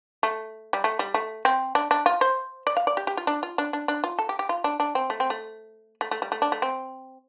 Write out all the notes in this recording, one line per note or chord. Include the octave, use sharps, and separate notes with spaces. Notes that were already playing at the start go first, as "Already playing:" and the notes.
A3
G3
A3
G3
A3
C4
D4
D4
F4
C5
D5
F5
D5
G4
G4
F4
D4
F4
D4
D4
D4
F4
A4
G4
G4
F4
D4
D4
C4
A3
C4
A3
A3
A3
G3
A3
D4
A3
C4